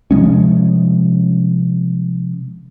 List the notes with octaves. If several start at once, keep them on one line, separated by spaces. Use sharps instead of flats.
C3 F3 G#3 C#4